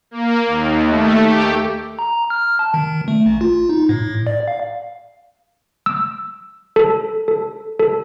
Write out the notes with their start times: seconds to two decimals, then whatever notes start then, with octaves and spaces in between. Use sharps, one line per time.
0.11 A#3
0.47 D#2
0.87 A3
1.21 G4
1.99 A#5
2.30 F6
2.59 A5
2.74 D#3
3.08 A3
3.26 A1
3.41 F4
3.69 D#4
3.89 A2
4.27 D5
4.48 F5
5.86 E6
6.76 A4
7.28 A4
7.80 A4